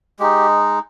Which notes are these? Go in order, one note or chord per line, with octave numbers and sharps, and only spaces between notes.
G#3 D#4 G4